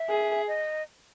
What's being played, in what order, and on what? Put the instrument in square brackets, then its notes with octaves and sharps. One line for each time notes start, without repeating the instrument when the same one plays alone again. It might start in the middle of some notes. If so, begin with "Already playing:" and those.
Already playing: [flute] E5
[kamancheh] G#4
[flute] D#5